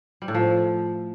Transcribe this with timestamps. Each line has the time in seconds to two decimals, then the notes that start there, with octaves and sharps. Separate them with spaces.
0.22 G3
0.28 A2
0.35 F3